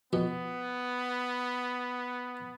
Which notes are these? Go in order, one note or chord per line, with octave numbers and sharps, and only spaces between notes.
F2 B2 B3